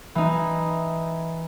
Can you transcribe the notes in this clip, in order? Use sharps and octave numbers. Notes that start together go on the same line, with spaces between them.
E3 D#4